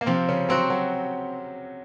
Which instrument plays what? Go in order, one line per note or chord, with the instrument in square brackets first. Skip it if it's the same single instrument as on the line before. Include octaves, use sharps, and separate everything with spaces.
[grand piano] A#3
[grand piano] C3 C4 [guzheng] F3
[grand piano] C#3 C#4
[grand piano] F#3 [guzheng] C4 F#4
[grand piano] F#3